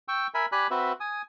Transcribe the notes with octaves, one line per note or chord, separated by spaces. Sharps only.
G5 C#6 E6
A#4 E5 G#5 B5
G4 D5 G#5 B5 F#6
C4 F#4 B4 E5
G#5 D#6